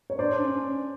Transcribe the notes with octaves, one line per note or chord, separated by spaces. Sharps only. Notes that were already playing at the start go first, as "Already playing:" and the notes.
C#5
D4 C5 D5
C#4